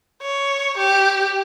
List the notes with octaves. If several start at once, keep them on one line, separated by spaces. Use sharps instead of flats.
C#5
G4